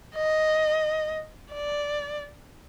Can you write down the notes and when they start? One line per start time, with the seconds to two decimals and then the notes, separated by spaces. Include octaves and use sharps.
0.16 D#5
1.53 D5